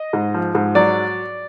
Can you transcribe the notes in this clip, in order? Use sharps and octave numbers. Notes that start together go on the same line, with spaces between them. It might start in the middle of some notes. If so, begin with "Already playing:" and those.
Already playing: D#5
G#2
F3
G#2
F#3 D5